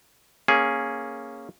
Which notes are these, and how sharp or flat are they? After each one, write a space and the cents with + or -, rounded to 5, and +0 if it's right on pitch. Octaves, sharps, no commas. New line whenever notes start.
A#3 +0 C#4 +0 G#4 +0